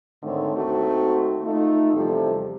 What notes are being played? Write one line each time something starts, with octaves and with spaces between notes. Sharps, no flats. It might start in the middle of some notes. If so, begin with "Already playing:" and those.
G#2 D3 D#3 A3 C4 C#5
D#2 D#3 A3 C4 F#4
A3 D#4 F4
E2 C3 F3 G3 A4